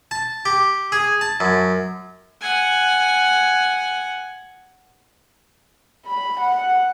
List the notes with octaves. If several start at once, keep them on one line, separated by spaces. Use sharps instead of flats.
A5
G4
G#4
A5
F#2
F#5 G#5
B5
F#5